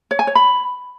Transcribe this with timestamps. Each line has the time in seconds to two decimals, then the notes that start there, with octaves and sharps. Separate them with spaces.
0.11 C#5
0.19 G#5
0.27 C#5
0.35 B5